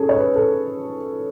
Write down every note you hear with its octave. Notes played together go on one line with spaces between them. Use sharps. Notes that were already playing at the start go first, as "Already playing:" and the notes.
Already playing: C#4 G#4 A4
C#5
B4
A4